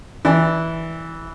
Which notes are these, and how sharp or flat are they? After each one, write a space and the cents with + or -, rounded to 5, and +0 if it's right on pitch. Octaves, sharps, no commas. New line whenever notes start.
E3 -10 D5 +0